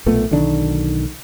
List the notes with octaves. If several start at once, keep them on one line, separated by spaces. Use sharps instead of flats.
B1 A#2 A3 B3
B1 D3 D#3 D4